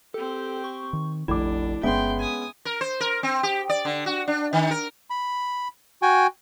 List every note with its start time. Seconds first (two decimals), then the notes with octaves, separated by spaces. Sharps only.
0.14 C4 G4 A4
0.64 C#6
0.93 D#3
1.28 F1 A#1 D4 E4 D6
1.83 D1 G1 G#3 B3 C#4 E5 G5 C6
2.19 G#5 D#6
2.65 A#4
2.81 C5
3.00 A#4
3.23 C4
3.43 G4
3.69 D5
3.85 D3
4.06 F#4
4.28 D4
4.53 D#3
4.71 A#4
5.10 B5
6.02 F#4 G5 G#5